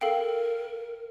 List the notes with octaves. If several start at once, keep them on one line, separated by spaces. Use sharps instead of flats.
A4 A#4 F5 G5